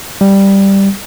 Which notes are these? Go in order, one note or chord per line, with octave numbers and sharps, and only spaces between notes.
G3